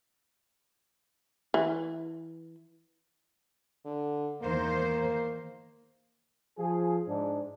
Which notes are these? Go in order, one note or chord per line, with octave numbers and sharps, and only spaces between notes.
E3
D3
E2 D#3 A#3 C5
F3 G#4
G#2 D4